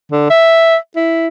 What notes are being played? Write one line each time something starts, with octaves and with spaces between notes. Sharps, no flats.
D3
E5
E4